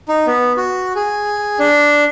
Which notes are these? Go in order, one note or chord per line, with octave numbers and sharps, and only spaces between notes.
D#4
B3
F#4
G#4
D4